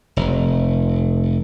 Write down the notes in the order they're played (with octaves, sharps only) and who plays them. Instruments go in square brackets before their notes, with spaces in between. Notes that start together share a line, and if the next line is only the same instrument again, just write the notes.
[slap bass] F1